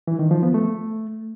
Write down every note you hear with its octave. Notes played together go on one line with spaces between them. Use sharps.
E3
D#3
F3
B3
A3